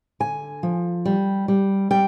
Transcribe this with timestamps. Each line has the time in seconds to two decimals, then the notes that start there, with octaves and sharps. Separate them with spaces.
0.20 D3 G#5
0.63 F3
1.05 G3
1.48 G3
1.91 G3 G5